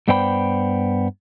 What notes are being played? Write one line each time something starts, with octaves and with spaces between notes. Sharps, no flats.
G2 B3 C5 D5 G5 B5